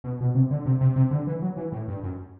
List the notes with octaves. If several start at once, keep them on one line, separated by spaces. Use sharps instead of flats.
B2
B2
C3
D3
C3
C3
C3
D3
E3
F#3
E3
A2
G2
F#2